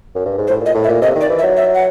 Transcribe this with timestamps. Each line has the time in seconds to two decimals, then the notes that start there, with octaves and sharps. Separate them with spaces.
0.15 F#2
0.26 G2
0.38 G#2
0.47 C5
0.50 A2
0.61 A#2
0.66 D#5
0.74 A2
0.84 E5
0.89 A#2
1.02 C3 D#5
1.15 D#3
1.21 D5
1.30 E3
1.39 E5
1.43 F#3
1.57 E5
1.75 F#5